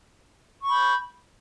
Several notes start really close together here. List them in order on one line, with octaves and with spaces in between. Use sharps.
C#6 B5 G6